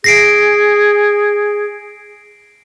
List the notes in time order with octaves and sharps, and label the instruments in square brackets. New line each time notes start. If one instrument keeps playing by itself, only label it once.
[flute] G#4 [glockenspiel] A#6 C7 D7